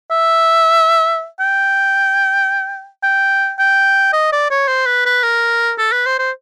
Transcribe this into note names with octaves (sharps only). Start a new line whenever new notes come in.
E5
G5
G5
G5
D#5
D5
C#5
C5
B4
B4
A#4
A4
B4
C5
C5